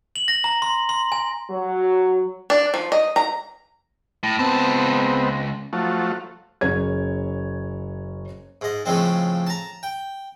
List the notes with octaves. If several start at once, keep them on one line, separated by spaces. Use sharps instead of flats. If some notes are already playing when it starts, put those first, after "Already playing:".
F#7
A#6
A#5
C6
C6
G#5
F#3
D4
F3
D#5
A#5
A2
C#2 B3 C4 A5
F3 F#3 A3
F#1 C#4 C#5 G#6
G#2 D#5
A2 C#3 F3 G#3 C4
A5 A#5
G5